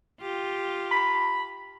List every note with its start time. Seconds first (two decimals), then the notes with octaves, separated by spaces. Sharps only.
0.21 F4 G4
0.91 B5